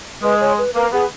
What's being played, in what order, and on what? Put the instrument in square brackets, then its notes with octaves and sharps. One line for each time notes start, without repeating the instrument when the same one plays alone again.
[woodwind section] G#3 [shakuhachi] B4
[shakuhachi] C#5
B4
[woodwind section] A#3 [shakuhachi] B4
[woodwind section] B3 [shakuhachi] G#4